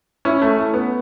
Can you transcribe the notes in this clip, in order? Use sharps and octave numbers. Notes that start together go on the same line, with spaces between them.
C#4 E4
A3
A3
B3